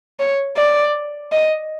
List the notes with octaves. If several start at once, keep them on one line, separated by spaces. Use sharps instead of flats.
C#5
D5
D#5